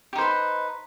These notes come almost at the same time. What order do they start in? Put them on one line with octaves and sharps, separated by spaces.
G4 D#4 C5 B4